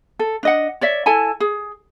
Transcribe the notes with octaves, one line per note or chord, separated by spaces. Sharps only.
A4
D4 D#5 F#5
C#5 D5 E5
E4 A4 G#5 A5
G#4